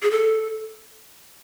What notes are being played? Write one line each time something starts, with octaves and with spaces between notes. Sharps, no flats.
G#4
A4